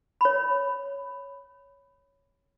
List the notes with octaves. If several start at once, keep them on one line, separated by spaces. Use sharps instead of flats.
C#5 B5